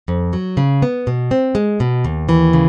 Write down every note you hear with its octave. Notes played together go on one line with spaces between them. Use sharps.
F2
F#3
C#3
B3
B2
C4
G#3
B2
D#2
E3
C#3